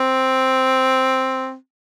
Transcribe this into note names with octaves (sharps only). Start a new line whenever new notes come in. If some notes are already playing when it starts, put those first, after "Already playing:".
Already playing: C4